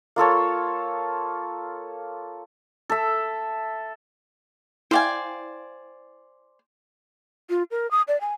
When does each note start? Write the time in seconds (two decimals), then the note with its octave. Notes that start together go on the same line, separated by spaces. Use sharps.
0.16 A#3 F4 A4 C#5
2.90 A4 E5
4.91 E4 C5 D5 F5 G5 G#5
7.50 F4
7.71 A#4
7.91 D#6
8.08 D5
8.21 G#5